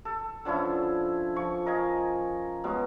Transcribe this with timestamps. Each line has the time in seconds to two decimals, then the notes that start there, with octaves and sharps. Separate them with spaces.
0.05 A4
0.45 D3 F3 C#4 E4
1.36 F3 C#6
1.66 A#4 D#5 F5 G#5
2.64 B2 F#3 G#3